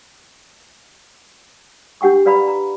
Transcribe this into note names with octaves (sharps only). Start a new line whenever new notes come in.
D4 G4 F#5 G5 C#6
B4 D5 F5 A#5 B5
A#5